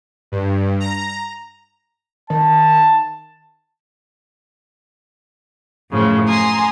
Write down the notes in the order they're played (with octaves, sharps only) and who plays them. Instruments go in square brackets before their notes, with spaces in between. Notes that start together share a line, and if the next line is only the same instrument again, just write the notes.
[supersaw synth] G2
A#5
[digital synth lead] D#3 [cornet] A5
[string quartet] F#2 A2 C#3 F3
G#5 A#5 C6 D#6